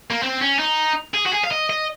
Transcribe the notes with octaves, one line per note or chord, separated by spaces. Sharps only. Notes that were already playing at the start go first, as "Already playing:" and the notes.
A#3
C4
C#4
D#4
G#4
F#4
G#4
F5
D#5
D#5